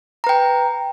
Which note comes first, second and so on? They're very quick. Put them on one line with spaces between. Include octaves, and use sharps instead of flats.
A#5 B4 G5